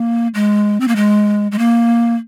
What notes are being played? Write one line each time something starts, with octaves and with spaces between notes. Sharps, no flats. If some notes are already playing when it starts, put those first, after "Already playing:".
Already playing: A#3
G#3
C4
A#3
G#3
G#3
A#3